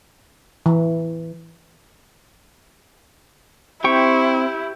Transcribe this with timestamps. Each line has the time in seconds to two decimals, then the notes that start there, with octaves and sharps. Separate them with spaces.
0.66 E3
3.84 C4 E4 G4 C5 G5 C#6